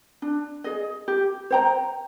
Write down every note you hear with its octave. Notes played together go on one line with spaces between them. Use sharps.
D4
G#4 D#5
G4
C5 G5 A#5